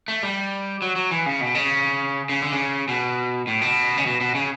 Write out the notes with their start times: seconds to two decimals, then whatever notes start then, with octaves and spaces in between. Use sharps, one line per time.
0.08 A3
0.23 G3
0.82 F#3
0.96 F#3
1.11 E3
1.26 C#3
1.41 B2
1.55 C#3
2.29 C#3
2.42 D3
2.53 C#3
2.88 B2
3.47 A2
3.61 B2
3.97 C#3
4.06 B2
4.21 B2
4.35 C#3